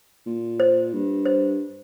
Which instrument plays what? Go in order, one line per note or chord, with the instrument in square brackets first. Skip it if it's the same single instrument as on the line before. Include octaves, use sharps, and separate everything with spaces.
[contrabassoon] A#2
[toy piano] C5
[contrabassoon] G2
[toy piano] C5